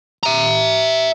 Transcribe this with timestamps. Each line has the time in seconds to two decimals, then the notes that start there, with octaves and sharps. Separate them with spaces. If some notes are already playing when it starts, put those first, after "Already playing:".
0.23 E5 A#5